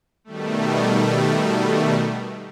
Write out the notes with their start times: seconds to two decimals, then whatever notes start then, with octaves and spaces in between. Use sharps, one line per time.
0.24 B2 D#3 G3 A3